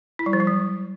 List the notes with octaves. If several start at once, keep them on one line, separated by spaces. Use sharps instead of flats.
E4
G3
F3
G3
F#3